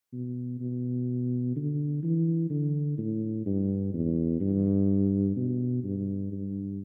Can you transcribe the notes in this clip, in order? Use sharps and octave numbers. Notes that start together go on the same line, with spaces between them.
B2
B2
D3
E3
D3
A2
G2
E2
G2
B2
G2
G2